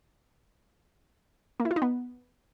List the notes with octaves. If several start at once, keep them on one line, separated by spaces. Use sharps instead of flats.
A#3
E4
F4
D#4
B3